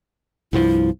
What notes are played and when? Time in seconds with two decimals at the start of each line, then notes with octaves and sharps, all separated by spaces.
0.53 C2 G2 F3 E4